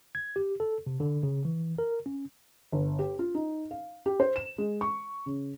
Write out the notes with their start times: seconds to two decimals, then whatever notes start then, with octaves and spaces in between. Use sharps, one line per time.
0.15 G#6
0.36 G4
0.60 A4
0.87 C3
1.00 D3
1.23 C#3
1.45 E3
1.78 A#4
2.06 C#4
2.72 G1
2.99 G4
3.19 F4
3.35 D#4
3.71 F5
4.06 G4
4.20 C5
4.36 E7
4.58 G#3
4.81 C#6
5.26 C#3